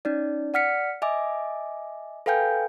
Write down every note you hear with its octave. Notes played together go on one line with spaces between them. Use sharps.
C#4 D#4 D5
D5 F#5 F6 B6 C#7
D#5 E5 G#5 D6
A4 B4 F5 G5 G#5 G6